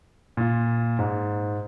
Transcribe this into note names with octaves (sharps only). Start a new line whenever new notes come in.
A#2 F4
G#2